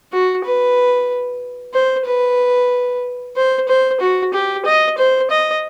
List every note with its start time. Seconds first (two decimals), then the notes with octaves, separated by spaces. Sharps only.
0.12 F#4
0.45 B4
1.74 C5
2.06 B4
3.36 C5
3.68 C5
4.00 F#4
4.33 G4
4.65 D#5
4.98 C5
5.31 D#5